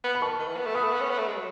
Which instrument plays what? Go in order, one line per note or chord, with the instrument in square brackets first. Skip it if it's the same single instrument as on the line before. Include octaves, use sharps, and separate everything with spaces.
[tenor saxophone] B3
[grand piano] B5
[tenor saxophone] D#3 [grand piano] A5 C#6
[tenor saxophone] D#3
E3
B3
A3
[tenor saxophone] B3 [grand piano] B5 D#6
[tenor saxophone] A3
B3
C#4
B3
A3
G#3
F#3